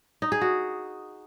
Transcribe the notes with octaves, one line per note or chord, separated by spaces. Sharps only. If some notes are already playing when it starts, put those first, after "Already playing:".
D#4
G#4
F#4